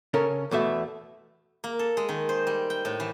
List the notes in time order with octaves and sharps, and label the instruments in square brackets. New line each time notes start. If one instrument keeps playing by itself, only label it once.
[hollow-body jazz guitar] C#3 C#4 A4 A#4
E2 B2 A3 E5
[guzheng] A#3
A4
G#3
D#3
C5
G3
G5
A2
E3